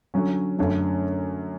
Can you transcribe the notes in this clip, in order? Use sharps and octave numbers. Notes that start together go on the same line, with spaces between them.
D3 F#3 C#4
F#2 D3 A3